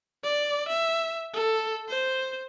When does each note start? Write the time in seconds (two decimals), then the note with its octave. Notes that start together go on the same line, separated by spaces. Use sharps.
0.24 D5
0.69 E5
1.34 A4
1.89 C5